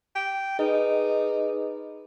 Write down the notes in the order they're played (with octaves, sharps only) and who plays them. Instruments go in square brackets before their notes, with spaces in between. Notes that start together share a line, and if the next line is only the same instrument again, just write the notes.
[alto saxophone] G5
[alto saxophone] D#4 [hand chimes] G#4 B4 D#5